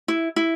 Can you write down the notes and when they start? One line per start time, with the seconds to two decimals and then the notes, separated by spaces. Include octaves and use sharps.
0.08 E4
0.36 E4